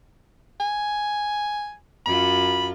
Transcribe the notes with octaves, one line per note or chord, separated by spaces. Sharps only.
G#5
F#2 F4 B5